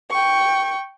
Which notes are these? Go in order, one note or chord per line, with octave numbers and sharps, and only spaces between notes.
G5 C#6